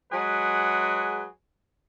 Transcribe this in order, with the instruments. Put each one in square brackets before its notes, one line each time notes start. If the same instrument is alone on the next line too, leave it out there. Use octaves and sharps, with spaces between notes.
[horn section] F#3 G#3 G#4 B4 F#5